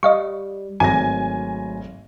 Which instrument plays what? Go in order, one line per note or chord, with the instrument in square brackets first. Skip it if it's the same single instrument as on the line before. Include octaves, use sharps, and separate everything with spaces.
[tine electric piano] G3 [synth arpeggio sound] D#5 F5 C#6
[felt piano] G#1 A#6 [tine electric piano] F#3 A3 [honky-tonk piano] G#5